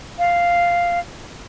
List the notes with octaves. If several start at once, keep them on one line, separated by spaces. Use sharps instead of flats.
F5